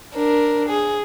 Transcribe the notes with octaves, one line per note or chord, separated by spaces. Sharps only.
D4 A#4
G#4